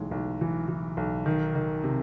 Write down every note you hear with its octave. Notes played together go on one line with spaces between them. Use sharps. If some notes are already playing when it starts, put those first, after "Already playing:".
Already playing: B1 A2 E3 G#3
B1
E3
E3
B1
D#3
D#3
C3